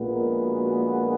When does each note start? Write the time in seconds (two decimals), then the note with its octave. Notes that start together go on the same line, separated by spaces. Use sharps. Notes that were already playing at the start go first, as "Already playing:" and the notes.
Already playing: A#1 A#2 G#3 B3
0.14 A#4
0.44 F#4